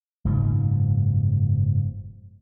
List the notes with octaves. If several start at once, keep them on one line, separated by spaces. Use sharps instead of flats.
F#1 G#2 B2 F3